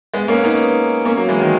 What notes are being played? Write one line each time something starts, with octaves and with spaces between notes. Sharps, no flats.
G#3 B3
A#3 C#4
B3 D#4
A#3 C#4
F#3 A#3
E3 G#3
D#3 F#3